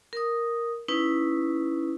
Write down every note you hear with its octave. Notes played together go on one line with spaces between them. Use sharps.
A#4 D#6
C#4 D#4 E4 B4